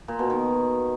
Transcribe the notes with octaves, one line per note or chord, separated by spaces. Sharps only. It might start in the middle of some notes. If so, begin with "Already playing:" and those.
A#2
B2
D#3